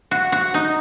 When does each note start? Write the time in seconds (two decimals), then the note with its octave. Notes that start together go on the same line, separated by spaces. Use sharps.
0.11 F#4
0.32 F#4
0.54 D#4